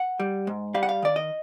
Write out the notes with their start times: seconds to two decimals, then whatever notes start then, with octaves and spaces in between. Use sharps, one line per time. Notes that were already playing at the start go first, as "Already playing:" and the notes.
Already playing: F#5
0.20 G3
0.47 G#2
0.74 G3 F5
0.83 F#5
0.89 F5
1.02 D#3 D5
1.16 D#5